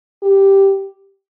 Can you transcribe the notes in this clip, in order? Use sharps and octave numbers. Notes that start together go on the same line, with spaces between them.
G4